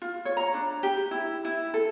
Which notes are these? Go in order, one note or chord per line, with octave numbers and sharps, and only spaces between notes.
F4
C#5
A#5
D4
G4
E4
E4
A4